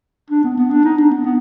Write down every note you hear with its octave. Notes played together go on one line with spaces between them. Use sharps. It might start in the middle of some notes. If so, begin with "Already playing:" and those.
D4
B3
B3
D4
D#4
D4
B3
B3